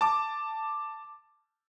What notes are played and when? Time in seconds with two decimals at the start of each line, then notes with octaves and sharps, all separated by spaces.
0.01 A5 D6